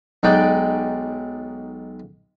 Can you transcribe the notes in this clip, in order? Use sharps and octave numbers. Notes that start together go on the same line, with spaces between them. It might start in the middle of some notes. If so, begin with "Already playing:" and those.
B1 G#3 D#4 D5 F#5 G5